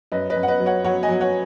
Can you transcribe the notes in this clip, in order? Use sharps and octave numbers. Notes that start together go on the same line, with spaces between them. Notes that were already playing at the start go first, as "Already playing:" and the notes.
F#2 B4 D#5
B4 D#5
F#2
F#5
B4 D#5
F#3
C#5 F#5
F#3 C#5 F#5
D#5 G#5
F#3
C#5 F#5